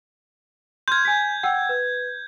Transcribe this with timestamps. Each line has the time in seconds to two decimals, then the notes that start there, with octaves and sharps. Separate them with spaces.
0.88 C6 F6 G6 G#6
1.05 G#5 B6
1.43 F#5 G5 E6
1.69 B4